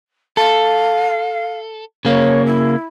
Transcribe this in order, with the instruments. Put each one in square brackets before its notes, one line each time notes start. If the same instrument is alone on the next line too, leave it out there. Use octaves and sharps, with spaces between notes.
[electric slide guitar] A4 [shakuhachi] F5
[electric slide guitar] C#3 A#3 [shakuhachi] C#5
[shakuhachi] E4